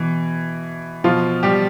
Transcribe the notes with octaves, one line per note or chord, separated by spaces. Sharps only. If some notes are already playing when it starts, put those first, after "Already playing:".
Already playing: B2 E3
B2 F3 F4
G3 G4